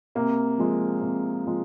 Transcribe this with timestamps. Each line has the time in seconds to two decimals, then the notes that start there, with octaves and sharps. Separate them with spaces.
0.15 C3 A#3
0.58 F3 G#3
1.01 C3
1.46 F3 G#3